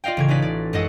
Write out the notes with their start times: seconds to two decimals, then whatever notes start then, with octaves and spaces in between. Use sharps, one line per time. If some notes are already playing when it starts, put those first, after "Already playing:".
0.04 F4 D5 D#5 F5 G5
0.17 A1 C#3 G#6
0.28 C#4 D#4 B4 D5 B6
0.42 D5
0.73 F#2 G#3 A4 D#5 F#5